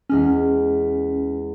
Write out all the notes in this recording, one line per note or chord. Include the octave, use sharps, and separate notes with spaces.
E2 G#3 C#4 F6